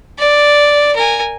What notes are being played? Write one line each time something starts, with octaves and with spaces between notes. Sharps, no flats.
D5
A#4 G#5